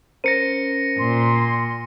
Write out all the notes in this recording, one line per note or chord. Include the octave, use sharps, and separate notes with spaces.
C#4 A#4 C5 A#6 C#7 D#7
A#2 C6